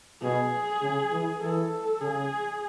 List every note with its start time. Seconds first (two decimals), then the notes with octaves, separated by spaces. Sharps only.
0.22 B2 G#4
0.82 C#3
1.12 E3
1.41 E3 A4
2.01 C#3 G#4